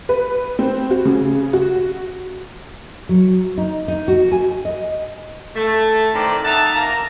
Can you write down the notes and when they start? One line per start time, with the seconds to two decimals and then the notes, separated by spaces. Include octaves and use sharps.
0.09 B4
0.59 C4
0.91 F#4
1.05 C#3
1.53 F#4
3.09 F#3
3.58 D#4
3.88 D#4
4.08 F#4
4.32 G#5
4.65 D#5
5.56 A3
6.14 D#3 E3 C4 A4 D5 A#5
6.44 D#4 E5 F#5 A5
6.76 A#3 A#5